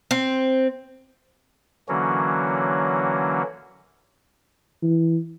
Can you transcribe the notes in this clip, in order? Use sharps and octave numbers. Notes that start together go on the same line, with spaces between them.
C4
D3 E3 F#3 A#3 C#4 F#4
E3